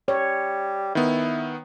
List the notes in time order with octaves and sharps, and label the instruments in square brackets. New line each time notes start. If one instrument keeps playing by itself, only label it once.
[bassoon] G3 [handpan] C#5
[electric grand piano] D#3 B3 [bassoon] E4